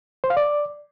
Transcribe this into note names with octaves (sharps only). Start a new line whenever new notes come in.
C5
F5
D5